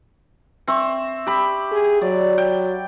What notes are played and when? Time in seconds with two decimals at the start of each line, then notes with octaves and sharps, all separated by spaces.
0.67 C4 E5 C#6
1.27 G4 B5
1.72 G#4
2.02 F#3 D5
2.38 G5